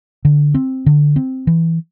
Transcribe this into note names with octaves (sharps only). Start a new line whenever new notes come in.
D3
C4
D3
C4
E3